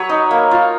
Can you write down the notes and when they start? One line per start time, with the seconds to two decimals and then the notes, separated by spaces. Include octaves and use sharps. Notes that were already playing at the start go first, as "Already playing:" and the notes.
Already playing: F#3 B4 C#5
0.09 D#4
0.31 A#3
0.51 F4